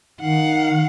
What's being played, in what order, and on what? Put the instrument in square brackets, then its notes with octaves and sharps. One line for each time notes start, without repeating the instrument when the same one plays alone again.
[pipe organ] D#3 [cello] F5 F#5